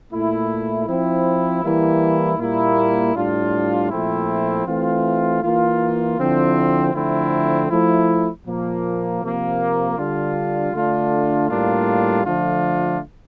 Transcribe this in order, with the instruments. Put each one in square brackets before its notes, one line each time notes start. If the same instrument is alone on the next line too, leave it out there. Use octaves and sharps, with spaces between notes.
[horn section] A#2 A3 E4
F3 C4 E4
E3 G3 A#3 E4
A#2 G3 A#3 E4
A2 G3 D4 F4
A#2 F3 A3 C4 E4
E3 A3 C4 F4
E3 A#3 F4
D3 F3 C4 E4
D3 F3 A3 C4 E4
F3 A3 E4
A#2 F3 A#3
C3 F3 A#3
D3 G3 D4 F4
D3 A3 D4 F4
A2 G3 A#3 D4 F4
D3 F3 A3 D4 F4